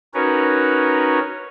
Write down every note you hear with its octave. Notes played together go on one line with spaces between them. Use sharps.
C#4 D#4 F#4 A#4 B4 C#5